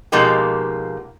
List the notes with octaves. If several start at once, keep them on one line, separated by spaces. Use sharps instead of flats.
B2 F3 G#3 A#3 D#4 G4